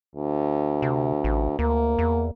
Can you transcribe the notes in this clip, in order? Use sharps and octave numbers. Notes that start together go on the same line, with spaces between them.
D2
C3
A1
D2 A#3
E2